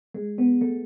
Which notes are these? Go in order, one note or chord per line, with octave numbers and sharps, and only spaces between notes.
G#3
B3
A3